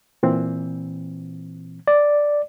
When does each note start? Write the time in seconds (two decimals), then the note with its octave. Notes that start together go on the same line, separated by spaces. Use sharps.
0.23 A#2 E3 C4
1.87 D5